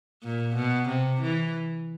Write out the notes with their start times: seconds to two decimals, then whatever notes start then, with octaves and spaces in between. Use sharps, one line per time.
0.23 A#2
0.56 B2
0.89 C3
1.22 E3